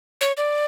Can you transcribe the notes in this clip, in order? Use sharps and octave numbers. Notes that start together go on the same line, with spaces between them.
C#5
D5